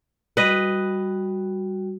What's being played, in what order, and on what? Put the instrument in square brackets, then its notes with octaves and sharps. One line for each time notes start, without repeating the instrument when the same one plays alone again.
[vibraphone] G3 F#4 [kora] B4 D#5